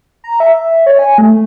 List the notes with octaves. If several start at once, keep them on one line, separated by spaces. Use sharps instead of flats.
A#5
E5
E5
C#5
G#5
A3